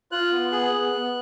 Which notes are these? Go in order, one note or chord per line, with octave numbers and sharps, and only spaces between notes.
F4 F#6
B3
G#4
B3
B3